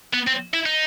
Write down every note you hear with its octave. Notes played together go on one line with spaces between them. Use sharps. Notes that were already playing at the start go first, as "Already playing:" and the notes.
B3
C4
E4
D#4